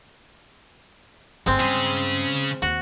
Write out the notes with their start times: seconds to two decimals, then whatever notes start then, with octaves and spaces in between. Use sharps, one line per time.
1.46 G1 G#2 G#3 C4
1.60 G2 C#3 G#4
2.62 D#2 F#4